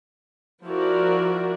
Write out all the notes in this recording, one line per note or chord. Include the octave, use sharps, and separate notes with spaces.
F3 E4 F#4 A#4 D5